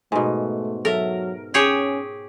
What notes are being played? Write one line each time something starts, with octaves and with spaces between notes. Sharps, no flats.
G#2 B2 A3 D#4 G#5
F#3 A4 A#4 E5
C#4 G4 G#4 C#5